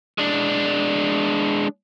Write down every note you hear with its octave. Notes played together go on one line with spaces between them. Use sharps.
G#3 D4